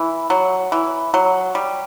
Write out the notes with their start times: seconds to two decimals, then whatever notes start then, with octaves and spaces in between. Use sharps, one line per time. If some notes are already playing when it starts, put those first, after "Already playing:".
Already playing: E3
0.30 F#3
0.72 E3
1.14 F#3
1.55 G3